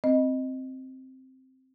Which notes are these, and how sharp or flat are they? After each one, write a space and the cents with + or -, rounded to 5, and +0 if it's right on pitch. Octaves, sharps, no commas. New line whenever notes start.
C4 +0 D#5 +0